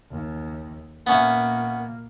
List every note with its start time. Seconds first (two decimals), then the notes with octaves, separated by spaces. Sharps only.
0.11 D#2
1.07 A#2 A#3 B3 C#4 E5